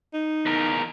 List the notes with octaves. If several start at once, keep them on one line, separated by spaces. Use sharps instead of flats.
D#4
E2 A#4